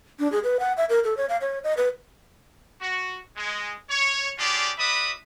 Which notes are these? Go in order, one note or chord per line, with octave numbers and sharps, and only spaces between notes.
D4
G#4
B4
F#5
E5
A#4
A4
C#5
F5
C#5
D#5
B4
F#4
G#3
C#5
C#4 D4 F4 G4 G#4 D5
F#4 B4 D5 E5 B5 D#6